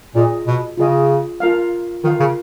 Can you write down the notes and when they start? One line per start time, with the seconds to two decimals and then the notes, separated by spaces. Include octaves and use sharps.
0.15 A#2 F4 G#4 D#5
0.47 B2
0.77 C#3 F4 G#4 D#5
1.40 F4 A#4 F5
2.04 D#3 F4 A#4 F5
2.20 C#3